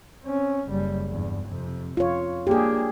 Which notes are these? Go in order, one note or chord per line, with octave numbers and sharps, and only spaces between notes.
C4 C#4
F#1 G3
E2 G2
F2 C3
F2 F4 C#5
A#3 D4 G4 G#4